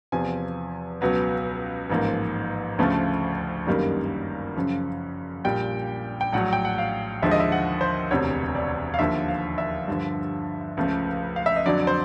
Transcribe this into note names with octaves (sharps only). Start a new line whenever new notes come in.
E2 C3 F3 G#5
C#2 B2 F#3 B3
A1 G#2 F3 A#3
D2 C#3 F3 A3
G1 F#2 D#3 G3 A#3
F#2 C#3 F3
A#1 A#2 G3 G5
G5
A#1 A2 F#3 F#5
G5
F#5
F5
D#2 D3 F3 G#3 E5
D#5
E5
F#5
C5
E1 D2 C3 C#5
D5
F5
D#2 D3 F3 A#3 E5
F5
E5
G2 D3 F3
C#2 C#3 F3 A3
F5
E5
D#5
F2 D3 F#3 D5
C5